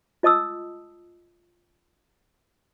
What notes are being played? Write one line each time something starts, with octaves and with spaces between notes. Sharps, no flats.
F4 D#5 A5 D#6 E6